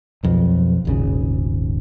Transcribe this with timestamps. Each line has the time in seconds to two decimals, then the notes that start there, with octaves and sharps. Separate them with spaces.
0.23 B1 F2
0.85 D#1 G#1 C#3